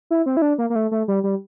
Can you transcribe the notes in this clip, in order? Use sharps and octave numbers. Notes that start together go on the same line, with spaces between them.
E4
C4
E4
D4
A#3
A#3
A3
A3
G3
G3